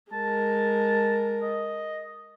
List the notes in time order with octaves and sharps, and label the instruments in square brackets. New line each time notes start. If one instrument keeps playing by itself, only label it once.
[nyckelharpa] G#3 A#4 [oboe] A5
[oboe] D#5